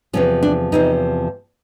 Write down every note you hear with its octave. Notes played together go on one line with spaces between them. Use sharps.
E2 C3 F3 C#4
D4
E2 C3 F3 D#4